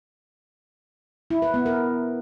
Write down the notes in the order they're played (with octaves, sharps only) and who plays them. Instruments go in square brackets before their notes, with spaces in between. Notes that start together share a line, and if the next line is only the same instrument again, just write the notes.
[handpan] E4
B4
B3
A#4